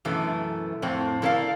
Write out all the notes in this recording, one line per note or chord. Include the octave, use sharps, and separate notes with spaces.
F#2 B2 E3 A3
F2 A2 C4
E4 A4 A#4 D5 D#5 F5